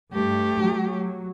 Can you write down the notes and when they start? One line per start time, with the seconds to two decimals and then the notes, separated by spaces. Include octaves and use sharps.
0.13 G2 A3 G4
0.60 F#3